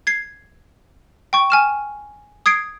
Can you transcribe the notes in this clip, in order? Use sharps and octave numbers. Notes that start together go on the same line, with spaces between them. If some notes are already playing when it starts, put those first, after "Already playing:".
G#6 C7
G5 C#6
G#5 F6 E7
D#6 G#6 C7 D7